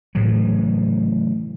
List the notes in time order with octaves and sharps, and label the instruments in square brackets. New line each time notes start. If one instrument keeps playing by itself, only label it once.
[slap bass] A2 C#3 E3 F#3